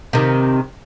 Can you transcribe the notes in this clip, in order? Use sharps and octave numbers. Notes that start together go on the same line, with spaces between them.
C3 D#3